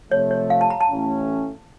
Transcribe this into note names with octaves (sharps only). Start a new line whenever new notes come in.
C3 F3 A3 C#5
C#5
F5
A5
A#5
A5
A1 A2 A3 C#4